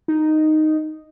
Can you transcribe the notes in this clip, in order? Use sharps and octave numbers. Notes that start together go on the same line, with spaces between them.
D#4